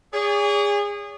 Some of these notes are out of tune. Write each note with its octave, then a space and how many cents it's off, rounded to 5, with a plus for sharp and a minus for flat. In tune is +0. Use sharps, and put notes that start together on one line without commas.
G#4 -25 C#5 +45